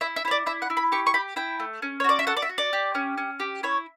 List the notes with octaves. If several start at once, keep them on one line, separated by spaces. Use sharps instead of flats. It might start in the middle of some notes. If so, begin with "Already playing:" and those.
E4 E5
E5
E4 C#5
D5
E4 E5
F#5
E4
B5
G4 C#6
C#6
G4 B5
E4 G5
A3
C#4
C#5
F#4 D5
E5
A4 F#5
D5
E5
F#4
D5
G4
C#4
C#4
G4
E4 C#5